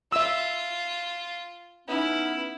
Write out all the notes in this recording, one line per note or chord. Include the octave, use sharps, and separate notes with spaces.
F4 E5 E6
B3 C#4 D#4 E4